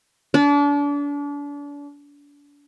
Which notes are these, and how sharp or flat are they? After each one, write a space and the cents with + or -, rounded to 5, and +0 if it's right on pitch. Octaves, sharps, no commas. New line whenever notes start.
D4 -35